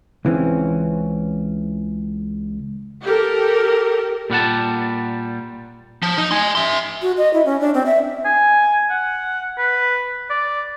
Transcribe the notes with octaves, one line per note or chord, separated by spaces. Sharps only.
C#2 E3 C4 C#4
G4 A4 A#4
A#2 G3 F#5 A5
F3
D#4
G#5 C6
E5 C6
F#4
D#5
E4
C#4
D4
C4
E5
G#5
F#5
B4
D5